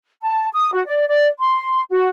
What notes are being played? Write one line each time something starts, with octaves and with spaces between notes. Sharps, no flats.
A5
D#6
F#4
D5
D5
C6
F#4